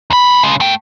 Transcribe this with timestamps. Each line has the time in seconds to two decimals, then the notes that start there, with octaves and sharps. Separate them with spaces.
0.10 D#2 B5
0.43 C#3 G#3
0.60 A3 G5